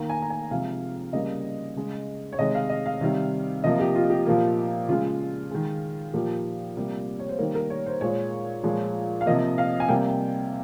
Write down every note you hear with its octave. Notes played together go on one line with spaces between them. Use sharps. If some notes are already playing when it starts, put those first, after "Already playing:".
Already playing: D#3 A#3 A#5
G#5
A#5
G#5
C3 F3 G#3 F5
C#3 G3 A#3 D#5
C#3 G#3
C#5
C3 D#3 G#3 D#5
F5
D#5
F5
C3 D#3 G3
C3 F3 A#3 D#5
G4
F4
G4
A#2 F3 A#3
C#3 G#3 F4
D#3 G#3
A#2 F3 A#3 G4
C3 G3 A#3
C#5
C5
D#3 G3 A#3 A#4
A#4
C#5
C5
A#2 G#3 C#5
A#2 F3 G#3
F5
C3 F3 A#3 D#5
F5
G#5
C3 G3 A#3 G5